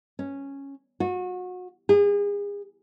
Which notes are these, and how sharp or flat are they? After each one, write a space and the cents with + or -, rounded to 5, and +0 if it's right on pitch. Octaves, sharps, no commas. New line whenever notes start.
C#4 -5
F#4 -30
G#4 -35